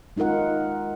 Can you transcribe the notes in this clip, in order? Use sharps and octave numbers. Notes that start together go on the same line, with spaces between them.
G#3 D#4 F4 A#4 F#5